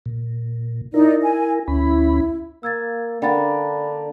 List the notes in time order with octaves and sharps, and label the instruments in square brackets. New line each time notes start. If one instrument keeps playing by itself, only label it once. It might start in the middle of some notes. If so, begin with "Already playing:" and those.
[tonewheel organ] A#2
[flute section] D#4 D5 [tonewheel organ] E4 A#4
[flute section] G#5
[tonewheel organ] D2 C#4 B5 [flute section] E4
[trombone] A#3 [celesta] E6 G#6 A6
[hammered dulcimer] D3 A#3 [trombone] D4 [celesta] G5 B5 A6